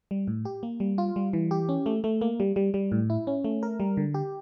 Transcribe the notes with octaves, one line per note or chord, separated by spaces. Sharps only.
G3
A2
G4
A#3
G3
F4
G3
E3
G4
C#4
A3
A3
A#3
G3
G3
G3
A2
E4
C#4
A3
A#4
G3
D3
G4